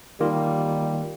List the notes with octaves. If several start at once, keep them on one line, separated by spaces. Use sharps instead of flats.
D#3 G3 A#3 F4